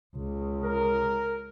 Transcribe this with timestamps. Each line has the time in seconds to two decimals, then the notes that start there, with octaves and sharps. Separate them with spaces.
0.16 C#2
0.64 A#4